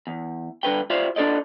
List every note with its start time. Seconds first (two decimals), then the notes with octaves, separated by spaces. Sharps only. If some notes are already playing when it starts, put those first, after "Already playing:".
0.07 E2
0.63 G2 D3 B4 G5
0.90 F4 G4 C5 D5 E5 F5
1.16 D4 F4 A4 D5 D#5